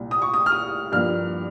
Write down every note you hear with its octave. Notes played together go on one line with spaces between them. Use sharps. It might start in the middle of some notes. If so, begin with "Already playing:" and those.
Already playing: C2 A#2
D#6
C#6
D#6
F6
D#6
G2 F3 A#3 F6